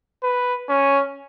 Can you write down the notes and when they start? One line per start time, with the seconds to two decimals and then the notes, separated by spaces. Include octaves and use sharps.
0.23 B4
0.69 C#4